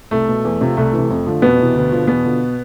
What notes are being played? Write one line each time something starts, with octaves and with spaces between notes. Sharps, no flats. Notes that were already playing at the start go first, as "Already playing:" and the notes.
C2 A3
B2
E2
C3 F3
C2 A3
C3 E3
F2
D3 F3
F2 B2 B3
C3 E3
D2
D3 F3
E2 B2 B3
D3 F3